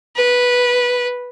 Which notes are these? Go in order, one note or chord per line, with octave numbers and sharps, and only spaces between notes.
B4